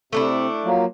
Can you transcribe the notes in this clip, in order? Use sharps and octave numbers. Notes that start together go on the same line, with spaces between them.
C3 A3 D4 E4
F3 F#3 A#3